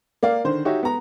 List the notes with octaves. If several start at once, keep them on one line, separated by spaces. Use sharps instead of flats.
A#3 D5 F5
D3 D#3 C5
D#4 F#4 G4 C#5 E5
B3 A#5